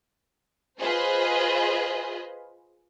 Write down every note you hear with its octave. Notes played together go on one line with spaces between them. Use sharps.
F4 G#4 B4 C5 D#5